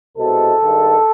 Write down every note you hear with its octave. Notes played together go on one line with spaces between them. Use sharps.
C2 B2 G#3 A4
G2 D#3 G#3